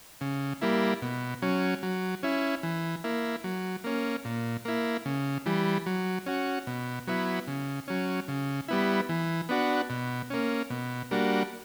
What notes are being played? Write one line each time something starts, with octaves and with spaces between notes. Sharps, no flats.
C#3
G3 A#3 E4
B2
F#3 C#4
F#3
C#4 E4
E3
A#3 E4
F#3
A#3 C#4
A#2
A#3 E4
C#3
E3 G3
F#3
C#4 F#4
B2
F#3 B3 E4
C#3
F#3 C#4
C#3
G3 B3 E4
E3
B3 D4 F#4
B2
A#3 C#4
B2
G3 A#3 D4 F#4